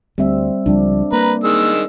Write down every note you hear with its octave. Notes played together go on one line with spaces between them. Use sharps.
D2 G3 C4 E5
C#2 F3 G3 D4
A#3 B4 A#5
D#3 G#3 E6